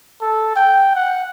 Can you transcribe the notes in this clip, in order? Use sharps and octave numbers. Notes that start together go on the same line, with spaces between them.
A4
G5
F#5